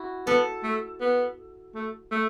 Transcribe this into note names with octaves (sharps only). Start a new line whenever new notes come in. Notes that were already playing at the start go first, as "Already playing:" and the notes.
Already playing: E4 F#4
B3 A4
A3
B3
A3
A3